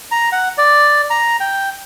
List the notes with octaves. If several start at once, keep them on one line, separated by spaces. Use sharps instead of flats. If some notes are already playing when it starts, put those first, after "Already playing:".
A#5
F#5
D5
A#5
G5